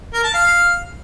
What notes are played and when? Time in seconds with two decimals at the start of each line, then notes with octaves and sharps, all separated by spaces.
0.14 A#4
0.24 A5
0.34 F5